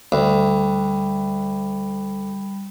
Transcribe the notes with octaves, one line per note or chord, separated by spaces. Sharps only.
D2 G3 B5